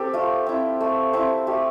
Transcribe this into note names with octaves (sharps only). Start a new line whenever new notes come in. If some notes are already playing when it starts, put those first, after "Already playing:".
Already playing: C4 G4 A4
A3 F4
C4 E4
A3
C4 E4
A3 G4